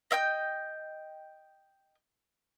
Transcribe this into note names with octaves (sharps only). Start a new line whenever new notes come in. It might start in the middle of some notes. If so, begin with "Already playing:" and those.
D#5 E5 G5 G6